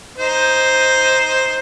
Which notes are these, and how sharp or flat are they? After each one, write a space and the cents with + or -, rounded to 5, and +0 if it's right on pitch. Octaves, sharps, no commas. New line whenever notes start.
D#4 +5 C5 +0